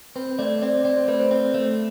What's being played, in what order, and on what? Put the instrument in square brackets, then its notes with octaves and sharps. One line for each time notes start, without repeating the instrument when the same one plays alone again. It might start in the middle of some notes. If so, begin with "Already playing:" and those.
[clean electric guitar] C4 [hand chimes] B4
[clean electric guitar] A3 [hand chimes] D5
[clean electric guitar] C4 [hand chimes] D5
[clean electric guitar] C4 [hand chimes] D5
[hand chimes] C5
[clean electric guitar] A3 [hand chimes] B4
[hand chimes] C5
[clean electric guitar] C4
A3